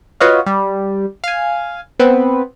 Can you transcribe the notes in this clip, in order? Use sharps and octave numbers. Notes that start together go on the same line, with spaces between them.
F4 F#4 B4 C#5 D#5 F5
G3
F5 G#5
B3 C4 B4